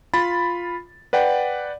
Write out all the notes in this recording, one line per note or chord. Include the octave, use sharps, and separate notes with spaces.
F4 B5 A6
B4 D5 F#5 G5